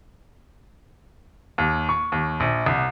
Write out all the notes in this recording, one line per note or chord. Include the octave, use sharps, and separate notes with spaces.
D#2
C#6
D#2
A#1
C2